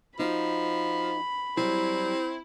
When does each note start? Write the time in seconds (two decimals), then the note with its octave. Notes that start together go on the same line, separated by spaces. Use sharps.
0.19 F3 D#4 F#4 B5
1.57 F#3 G3 C4 E4